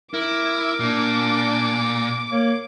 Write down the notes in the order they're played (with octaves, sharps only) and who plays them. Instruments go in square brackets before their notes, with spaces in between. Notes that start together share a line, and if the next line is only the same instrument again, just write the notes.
[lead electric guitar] E4 [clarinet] A#4 [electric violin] D6
[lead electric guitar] A#2 [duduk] D4
[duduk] A#3 [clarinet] C#5